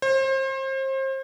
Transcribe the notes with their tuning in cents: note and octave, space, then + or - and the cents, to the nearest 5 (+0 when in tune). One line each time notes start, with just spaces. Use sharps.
C5 +35